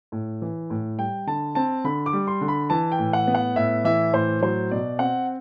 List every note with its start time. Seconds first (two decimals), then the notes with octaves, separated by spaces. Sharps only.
0.12 A2
0.42 E3
0.70 A2
0.98 G3 G5
1.27 D3 A5
1.55 C4 A5
1.84 D3 B5
2.06 D6
2.13 G3
2.27 C6
2.41 D3
2.48 B5
2.70 E3 A5
2.92 G5
2.99 A2
3.13 F#5
3.27 B3
3.35 F#5
3.56 A2 E5
3.84 E3 E5
4.13 A2 C5
4.42 F#3 C5
4.71 B2 D5
4.99 C4 F#5